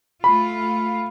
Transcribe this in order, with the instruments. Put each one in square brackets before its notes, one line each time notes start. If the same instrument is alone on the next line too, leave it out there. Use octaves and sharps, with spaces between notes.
[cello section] A3 F4 [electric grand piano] B5